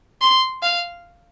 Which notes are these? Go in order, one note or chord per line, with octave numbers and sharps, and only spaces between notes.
C6
F5